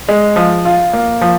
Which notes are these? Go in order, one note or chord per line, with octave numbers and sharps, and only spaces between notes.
G#3
F3
F4
A#3
F3